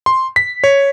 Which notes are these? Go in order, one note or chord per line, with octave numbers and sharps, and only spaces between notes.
C6
B6
C#5